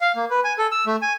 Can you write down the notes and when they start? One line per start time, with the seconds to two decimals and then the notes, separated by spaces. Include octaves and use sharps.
0.01 F5
0.16 A#3
0.30 B4
0.44 G#5
0.58 A4
0.71 E6
0.86 A3
1.02 G#5